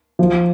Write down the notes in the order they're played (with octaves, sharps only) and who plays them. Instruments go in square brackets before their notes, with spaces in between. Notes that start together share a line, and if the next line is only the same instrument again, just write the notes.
[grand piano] F3